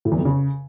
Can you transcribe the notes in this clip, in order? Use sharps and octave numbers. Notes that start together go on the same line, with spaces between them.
A2
E2
F2
C#3